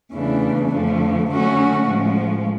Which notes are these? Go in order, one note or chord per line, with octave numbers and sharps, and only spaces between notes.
E2 C#3 E3 A3 D4
F2 D3 F3 A3
D3 F#3 A3 C#4 F#4
A2 F3 G#3